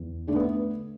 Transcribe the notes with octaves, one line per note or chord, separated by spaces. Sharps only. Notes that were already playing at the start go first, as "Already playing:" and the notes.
Already playing: E2
D3 A3 D4
B3